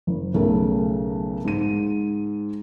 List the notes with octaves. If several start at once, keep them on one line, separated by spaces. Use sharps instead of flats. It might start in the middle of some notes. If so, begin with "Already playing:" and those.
F#1
B1 C#3 A3 A#4
G#2 D#7